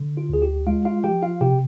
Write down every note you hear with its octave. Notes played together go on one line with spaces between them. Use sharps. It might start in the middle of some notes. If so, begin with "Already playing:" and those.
Already playing: D3
F4
D2 G#4
G4
G#3 F4 F5
F4 F5
F3 G4 G5
F4 F5
C3 G4 G5